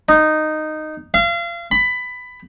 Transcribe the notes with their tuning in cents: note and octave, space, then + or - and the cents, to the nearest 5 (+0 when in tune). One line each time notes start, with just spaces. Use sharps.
D#4 -10
F5 -35
B5 +15